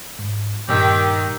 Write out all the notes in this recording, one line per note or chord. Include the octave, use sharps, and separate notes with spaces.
G#2
G2 A#2 D#3 G4 E6